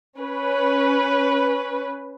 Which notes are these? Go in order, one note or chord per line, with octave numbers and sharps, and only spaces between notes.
C#4 B4